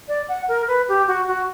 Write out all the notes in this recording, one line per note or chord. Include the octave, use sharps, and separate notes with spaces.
D5
F#5
A#4
B4
G4
F#4
F#4